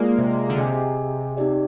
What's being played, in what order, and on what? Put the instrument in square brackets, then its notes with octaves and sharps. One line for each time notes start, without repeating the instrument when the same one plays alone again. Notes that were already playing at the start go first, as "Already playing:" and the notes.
Already playing: [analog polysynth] G#3 A#3 [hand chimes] F4 G#4 D5
[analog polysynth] C3
D3
[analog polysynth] C3 [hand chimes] G#4 D#5 G#5
[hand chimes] C4 D#4 G4 D5